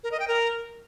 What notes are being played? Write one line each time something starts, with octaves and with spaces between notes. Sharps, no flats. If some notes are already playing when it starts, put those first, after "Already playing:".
A#4
D#5
G5
A#4